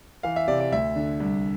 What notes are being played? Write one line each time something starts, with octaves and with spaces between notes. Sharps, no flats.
E3 F5
E5
C3 D5
D5
D2 E5
D3
C2